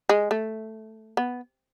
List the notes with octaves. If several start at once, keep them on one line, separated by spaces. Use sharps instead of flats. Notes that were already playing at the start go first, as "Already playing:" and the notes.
G#3
A3
B3